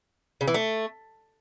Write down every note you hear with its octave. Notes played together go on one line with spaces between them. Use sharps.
C#3
E3
A3